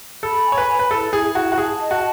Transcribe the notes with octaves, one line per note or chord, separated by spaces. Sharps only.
A4 B5
G#5
C#5
B4
B5
B4
E4 A4
E4 G#4
E4 F#4
F#4
G#4 A5
D#5
F#4